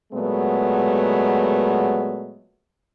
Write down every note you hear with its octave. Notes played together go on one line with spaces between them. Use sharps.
A#2 F#3 G#3 A3 B3